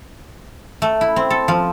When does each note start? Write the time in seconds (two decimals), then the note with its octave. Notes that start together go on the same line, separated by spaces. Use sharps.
0.82 A3
1.01 E4
1.16 C4
1.30 A4
1.48 F3